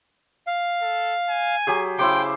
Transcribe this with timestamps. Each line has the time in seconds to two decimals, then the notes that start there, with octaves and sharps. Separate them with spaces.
0.47 F5
0.82 A4
1.30 G#5
1.67 F#3 G4 G#4
1.99 C#3 E4 C5 G5 D6